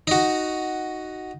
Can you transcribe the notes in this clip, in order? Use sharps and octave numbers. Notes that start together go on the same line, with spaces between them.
D#4 F#4